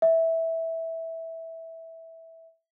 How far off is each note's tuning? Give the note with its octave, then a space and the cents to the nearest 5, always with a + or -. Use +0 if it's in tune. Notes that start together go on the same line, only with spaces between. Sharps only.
E5 -10